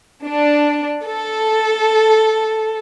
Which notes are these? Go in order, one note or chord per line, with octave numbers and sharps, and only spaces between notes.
D4
A4